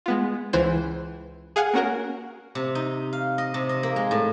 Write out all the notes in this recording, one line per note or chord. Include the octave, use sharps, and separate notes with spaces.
G#3 B3 F4
C#2 E3 C5 G6
G#4 F5 F#5 G#5
A#3 C#4 F#4 A#4
C3
D#4
F5
D#5
C3
D#5
A#3
G#3
A2